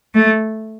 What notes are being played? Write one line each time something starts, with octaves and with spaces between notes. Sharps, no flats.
A3